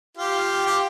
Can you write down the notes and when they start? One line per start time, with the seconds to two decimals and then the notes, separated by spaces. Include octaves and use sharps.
0.17 F4 G4
0.66 G4